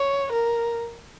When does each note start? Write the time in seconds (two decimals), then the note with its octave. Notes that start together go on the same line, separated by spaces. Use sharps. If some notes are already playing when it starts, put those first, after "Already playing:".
Already playing: C#5
0.32 A#4